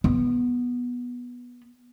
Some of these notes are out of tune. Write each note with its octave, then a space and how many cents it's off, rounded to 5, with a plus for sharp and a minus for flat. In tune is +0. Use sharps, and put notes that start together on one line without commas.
B3 -10